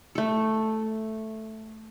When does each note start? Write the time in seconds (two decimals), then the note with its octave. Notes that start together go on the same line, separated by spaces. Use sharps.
0.15 A3 A4